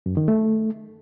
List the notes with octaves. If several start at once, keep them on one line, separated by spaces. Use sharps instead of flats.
F#2
D#3
A3